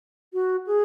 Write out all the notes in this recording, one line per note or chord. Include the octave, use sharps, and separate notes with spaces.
F#4
G#4